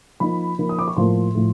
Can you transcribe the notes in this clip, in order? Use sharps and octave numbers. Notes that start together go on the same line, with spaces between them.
F3 A#3 D#4 B5
F3 A#3 D#4
D#6
D6
C#6
A2 F3 A#3 C6
A2 F3